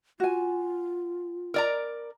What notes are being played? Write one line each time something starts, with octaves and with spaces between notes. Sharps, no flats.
F4 F#4 G#5
A#4 D5 A#5